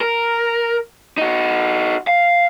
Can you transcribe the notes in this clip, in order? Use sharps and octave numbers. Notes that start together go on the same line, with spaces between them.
A#4
D#4 F#4
F5